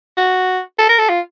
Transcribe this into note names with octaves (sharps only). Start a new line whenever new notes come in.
F#4
A4
A#4
A4
F4